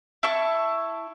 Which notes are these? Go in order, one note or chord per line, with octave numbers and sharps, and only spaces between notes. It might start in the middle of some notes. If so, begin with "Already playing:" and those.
E4 A5 C#6